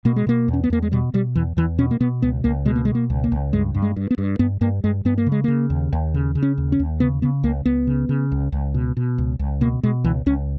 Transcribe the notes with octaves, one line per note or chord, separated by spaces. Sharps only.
B2 A#3
G#3
B2 A#3
E2
C#4
B3
E2 A#3
G#3
B2 G3
B2 G3
E2 E3
E2 E3
B2 C#4
A#3
B2 B3
C#2 B3
C#2 A#3
B2 G#3
A#3
G#3
B2
A#3
C#2
A#3
C#2
G2 G#3
G2
G#3
G2
B3
G2
G2 B3
G2 A#3
G2 G#3
G2 B3
A#3
C#3
G#3
C#3 A#3
D#2
D#2
C#3
C#3
C#4
D#2
C#4
D#2
C#3 B3
C#3 B3
C#2 A#3
C#2 B3
C#3
C#3
C#2
C#2
B2
B2
C#2
C#2
B2 A#3
B2 G#3
C#2 E3
C#2 C#4